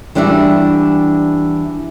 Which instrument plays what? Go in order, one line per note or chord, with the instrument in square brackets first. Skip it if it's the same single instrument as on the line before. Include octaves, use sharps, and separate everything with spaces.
[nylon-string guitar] E3 G3 D4 F#4 E5